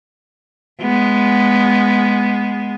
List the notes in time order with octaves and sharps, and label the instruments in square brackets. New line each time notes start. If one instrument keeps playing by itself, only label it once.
[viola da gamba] G#3 B3